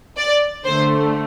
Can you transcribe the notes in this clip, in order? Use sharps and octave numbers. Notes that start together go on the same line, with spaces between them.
D5
D3 A3 C5